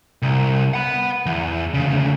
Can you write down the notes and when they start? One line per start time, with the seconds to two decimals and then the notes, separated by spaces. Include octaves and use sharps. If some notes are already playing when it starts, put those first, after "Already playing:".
0.22 C2
0.74 F#5 B5
1.26 E2
1.74 D2 C#3